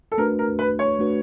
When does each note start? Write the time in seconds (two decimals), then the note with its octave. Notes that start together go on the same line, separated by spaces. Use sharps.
0.12 A4
0.18 A3 D4 F#4 A#4 B4
0.39 A#4
0.59 B4
0.79 C#5
0.99 A3 D4 F#4 B4